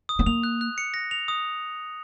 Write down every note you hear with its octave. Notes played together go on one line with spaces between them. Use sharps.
D#6
B3
A#3 F7
F#6
F#6
C#7
A#6
F7
D#6